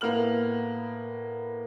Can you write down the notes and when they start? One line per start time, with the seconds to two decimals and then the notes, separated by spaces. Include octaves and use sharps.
0.01 A2 A#3 B3 F6 F#7